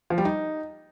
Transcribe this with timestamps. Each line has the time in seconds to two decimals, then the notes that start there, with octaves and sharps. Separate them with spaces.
0.10 F3
0.18 G3
0.25 D#4